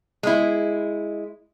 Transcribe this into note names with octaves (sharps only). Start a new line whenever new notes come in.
G#3 E4